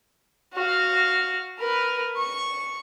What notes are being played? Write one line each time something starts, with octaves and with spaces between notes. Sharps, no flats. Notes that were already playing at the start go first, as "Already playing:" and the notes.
F#4 F5
A#4 B4
C#6